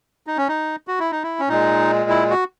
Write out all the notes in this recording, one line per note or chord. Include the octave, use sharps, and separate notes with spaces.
D#4
C#4
D#4
F#4
E4
D#4
E4
C#4
A#2 G#3 D#4
E4
F#4